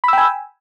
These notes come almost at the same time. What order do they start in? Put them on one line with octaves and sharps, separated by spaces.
B5 E6 G5 G#5